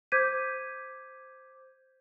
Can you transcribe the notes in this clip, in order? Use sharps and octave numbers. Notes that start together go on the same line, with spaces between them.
C5 D6 G6 G#6 B6 D#7